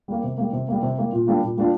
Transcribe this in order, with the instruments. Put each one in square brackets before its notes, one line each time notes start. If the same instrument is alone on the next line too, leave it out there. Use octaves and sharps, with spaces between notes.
[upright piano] G3 A#3
C3
G3 A#3
C3
G3 A#3
C3
G3 A#3
A#2
G3 A#3 D4 F4
A#2
G3 A#3 D4 F4